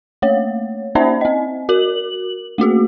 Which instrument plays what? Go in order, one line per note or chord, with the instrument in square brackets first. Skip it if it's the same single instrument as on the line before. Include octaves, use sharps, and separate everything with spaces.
[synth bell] A3 A#3 C#5
A#3 C#4 D#4 C5 D5 E5
C4 D#5
F#4 A#4 F#7
A3 A#3 F#4 G#4